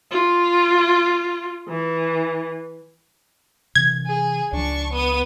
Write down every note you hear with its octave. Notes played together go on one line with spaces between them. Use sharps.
F4
E3
C3 E3 G#6
G#4
C#2 F3 D4 C#6
B3 D#6